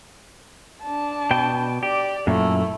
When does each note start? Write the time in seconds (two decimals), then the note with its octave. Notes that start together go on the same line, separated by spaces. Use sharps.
0.83 D4 A5
1.31 B2 G5
1.83 G4 D5
2.27 F#2 A#2 A3 E4